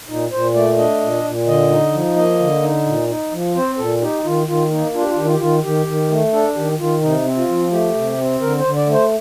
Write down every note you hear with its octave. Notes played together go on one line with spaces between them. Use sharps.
A#2 D#4
A#2 C5
A3 D5
D4 D#5
A#2
A#2
D3 D#5
D#4
F3
A#3 D#5
D3
D#4
A#2
D#4
F3
C4 C5
A#2 A4
D#4 G4
D#3 F4
D#3 F4
A#3 D#4
D4 F4
G4
F4
D#3 G4
F4
G4
D#3 F4
D#3 G4
D#3
A3
D4 A4
D#3 G4
D#3 F4
C3 D#4
C4
F4
F3
A3 G4
C3
C4
D3 A#4
C5
D3
D5
A3
C5